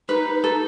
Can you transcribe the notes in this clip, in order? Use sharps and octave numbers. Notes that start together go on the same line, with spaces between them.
D#4 B4
A4